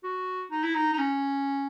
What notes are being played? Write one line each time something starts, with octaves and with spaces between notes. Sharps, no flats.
F#4
D#4
E4
D#4
D#4
C#4